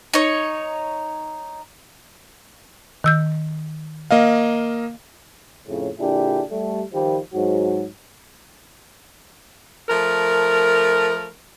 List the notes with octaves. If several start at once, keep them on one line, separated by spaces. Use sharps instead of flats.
D#4 C#5
D#3 E6 G6
A#3 D#5 F5
F2 A2 C#3
A#2 D3 D4 E4 G4 G#4
G3 A3
D#3 F3 G3
G#2 F#3 F#4
F3 A3 A#4